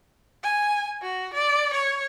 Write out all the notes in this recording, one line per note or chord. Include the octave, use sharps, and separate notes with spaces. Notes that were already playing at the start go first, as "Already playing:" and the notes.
G#5
F#4
D5
C#5